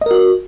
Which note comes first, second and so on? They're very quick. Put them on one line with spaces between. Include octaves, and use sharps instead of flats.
D#5 A#4 F#4